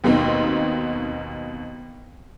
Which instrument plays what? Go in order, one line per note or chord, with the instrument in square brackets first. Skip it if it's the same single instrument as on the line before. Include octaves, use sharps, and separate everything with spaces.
[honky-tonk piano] D#2 B2 F#3 C4 D#4